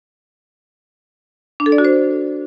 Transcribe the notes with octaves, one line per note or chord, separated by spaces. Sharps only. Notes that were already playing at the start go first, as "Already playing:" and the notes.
D4
A4
D5
F#4
C5